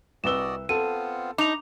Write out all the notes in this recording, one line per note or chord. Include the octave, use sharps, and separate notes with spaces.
C2 F#4 B4 D5 D#5 E6 E7 G7
B3 C4 F4 A4 D#7
D4 D#4 D6 F7